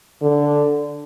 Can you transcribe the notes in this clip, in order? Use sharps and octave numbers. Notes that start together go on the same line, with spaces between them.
D3